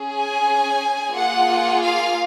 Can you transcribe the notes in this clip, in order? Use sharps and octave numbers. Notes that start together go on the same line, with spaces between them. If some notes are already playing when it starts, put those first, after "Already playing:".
Already playing: C#4 G#4
G#5
A#3 F4 G#4 F#5
F5